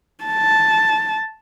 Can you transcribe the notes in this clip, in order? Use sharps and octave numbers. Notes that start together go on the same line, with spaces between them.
A5